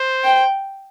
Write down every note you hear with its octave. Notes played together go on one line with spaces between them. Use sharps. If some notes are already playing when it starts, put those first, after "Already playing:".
Already playing: C5
G5